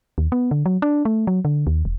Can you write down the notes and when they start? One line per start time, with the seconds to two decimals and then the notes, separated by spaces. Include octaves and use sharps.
0.18 D#2
0.32 B3
0.51 D3
0.66 F#3
0.82 D4
1.05 A3
1.27 F#3
1.45 D3
1.67 D#2
1.85 E1